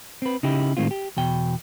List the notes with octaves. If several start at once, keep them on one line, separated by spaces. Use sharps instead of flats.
C4 B4
C#3 D#4 E4 G4
A2 D#3 G#3 C4 F4
G4
E2 B2 G5